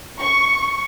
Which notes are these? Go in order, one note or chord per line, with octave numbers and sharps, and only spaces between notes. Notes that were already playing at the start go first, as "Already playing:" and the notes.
C#6